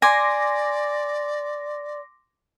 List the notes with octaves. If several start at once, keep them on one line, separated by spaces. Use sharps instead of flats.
D5 G#5 C6 D6 A#6